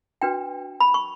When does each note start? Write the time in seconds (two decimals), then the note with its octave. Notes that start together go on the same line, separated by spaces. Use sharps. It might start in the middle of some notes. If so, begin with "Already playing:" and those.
0.22 D4 F#4 B4 G5
0.80 B5
0.94 C#6